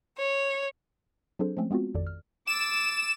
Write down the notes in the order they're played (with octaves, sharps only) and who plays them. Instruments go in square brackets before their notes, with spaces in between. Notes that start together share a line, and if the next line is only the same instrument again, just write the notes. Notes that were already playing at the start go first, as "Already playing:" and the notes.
[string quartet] C#5
[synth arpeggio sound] F#3 C4 D4 G#4 A4 C5
F3 G#3 A3 C4 C#4
G#3 B3 C4 F4 F#4
A1 F2 D#3 A4 D5
F6
[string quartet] D6 E6 A6 [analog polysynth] E7